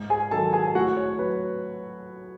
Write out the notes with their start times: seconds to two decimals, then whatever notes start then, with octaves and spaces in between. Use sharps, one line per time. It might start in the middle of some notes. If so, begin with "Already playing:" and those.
Already playing: G#2
0.10 G#4 G#5
0.31 D#3 F#3 A4 A5
0.53 G#4 G#5
0.67 G#5
0.75 A2 F#4 F#5
0.97 C#5
1.19 F#3 B4